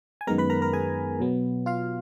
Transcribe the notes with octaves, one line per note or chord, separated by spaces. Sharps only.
G#5
F#2 D#3 G#3 B3 A#4 A#5
B4 B5
A#4 A#5
A#4 A#5
G#4 G#5
B2 F#3 B3
F4 F5